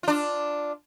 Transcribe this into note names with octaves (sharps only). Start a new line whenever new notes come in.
D4 F4